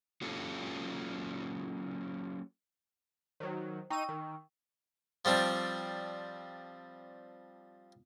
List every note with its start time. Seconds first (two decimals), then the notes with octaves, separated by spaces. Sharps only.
0.22 F#3 A#3 C#4 F4 G4 A4
3.40 D#3 F#3 C5
3.90 D#4 G5 C#6 E6 D#7
4.09 D#3
5.25 F3 G3 C4 D4